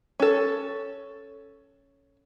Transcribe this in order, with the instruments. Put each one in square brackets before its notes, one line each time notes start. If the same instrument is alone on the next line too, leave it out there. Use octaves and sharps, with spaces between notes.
[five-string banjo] C#4 A4